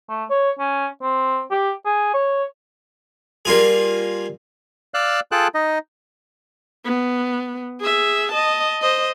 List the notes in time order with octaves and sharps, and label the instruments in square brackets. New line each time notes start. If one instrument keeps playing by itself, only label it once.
[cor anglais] A3
C#5
C#4
C4
G4
G#4
C#5
[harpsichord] G3 A#3 F4 G#4
[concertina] D5 F5 E6 F#6
F4 G#4 A4 G5 A5 F#6
D#4 D#5
[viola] B3
G#4 E5
D#5 A5
C5 D#5